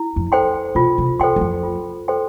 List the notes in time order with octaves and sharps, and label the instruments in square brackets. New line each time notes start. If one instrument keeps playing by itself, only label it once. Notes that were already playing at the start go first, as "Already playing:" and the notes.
Already playing: [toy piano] E4
[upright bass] F2
[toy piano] A4 C5 G5 C6
[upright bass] B2 [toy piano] F4
[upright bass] C3
[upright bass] E3 [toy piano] A4 C5 G5 C6
[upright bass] E2
F2
[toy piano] F4
A4 C5 G5 C6